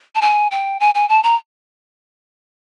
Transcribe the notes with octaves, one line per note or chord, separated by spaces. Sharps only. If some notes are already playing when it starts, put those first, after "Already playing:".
A5
G#5
G5
G#5
G#5
A5
A#5